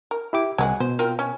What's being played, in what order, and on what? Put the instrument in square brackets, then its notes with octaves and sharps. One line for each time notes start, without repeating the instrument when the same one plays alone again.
[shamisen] A#4
[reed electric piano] E4 G4 D6
[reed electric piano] C2 G#5 [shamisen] F#3 G#3 F#5
[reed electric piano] B2 [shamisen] C5
[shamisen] C4 F4 A#4
C#4